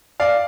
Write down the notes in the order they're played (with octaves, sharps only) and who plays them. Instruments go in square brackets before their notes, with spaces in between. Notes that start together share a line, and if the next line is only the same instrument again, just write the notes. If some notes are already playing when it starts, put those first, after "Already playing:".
[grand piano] D5 F5